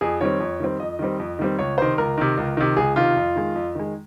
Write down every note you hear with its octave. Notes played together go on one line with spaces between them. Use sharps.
F2 G#4
D#3 G3 C4 C#5
F2
D#3 G3 C4
F2 D#5
D#3 G3 C4
F2
D#3 G3 C4
C#2 C#5
C3 D#3 C5
C#2 A#4
C3 D#3
C#2
C3 D#3
C#2 G#4
C3 D#3 F4
F2
D#3 G#3
F2
D#3 G#3